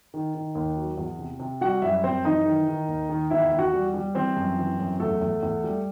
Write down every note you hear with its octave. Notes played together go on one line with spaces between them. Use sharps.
D#3
D#3
D#2
F#3
E2
C3
C3
G3 F#4 F#5
F#2 E4 E5
F#2 C4 C5
E3 D#4 D#5
D#3
D#3
D#2
D#3
E2 E4 E5
E2
F#4 F#5
G3
G3
E3 C4 C5
F#2
E3
F#2
E2 A3 A4
E2
E2
G3